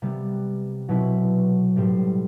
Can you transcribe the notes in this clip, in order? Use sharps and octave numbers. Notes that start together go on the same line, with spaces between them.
C3 G3 B3
B2 F#3 C4 E4 B4
A2 G3 C4 G4 C5